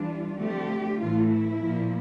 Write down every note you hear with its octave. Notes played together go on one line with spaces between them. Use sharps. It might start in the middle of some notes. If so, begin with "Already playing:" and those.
Already playing: E3 G3 D4 F4
D3 F3 A3 C4 G4
A2 E3 A3 F4
E4
A#2 F3 A#3